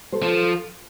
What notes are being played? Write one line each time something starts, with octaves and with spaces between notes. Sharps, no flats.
A4 C5
F3